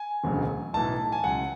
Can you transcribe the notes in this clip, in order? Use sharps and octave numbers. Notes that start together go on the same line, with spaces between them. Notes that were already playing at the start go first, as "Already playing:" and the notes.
Already playing: G#5
E1 D2 C#3 F#3
B1 A2 E3 A5
G#5
C#2 C#3 F#3 F#5